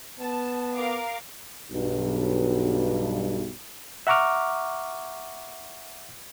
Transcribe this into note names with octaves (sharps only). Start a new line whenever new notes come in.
B3 A5
A#4 F5 D6
B1 G2
E5 F#5 A#5 C#6 D6 F6